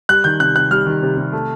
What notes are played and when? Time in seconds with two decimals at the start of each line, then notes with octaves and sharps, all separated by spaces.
0.09 G3 F#6
0.24 D#3 G6
0.40 C3 F#6
0.55 C3 F#6
0.71 G3 F6
0.86 D#3
1.03 C3
1.17 C3
1.33 A3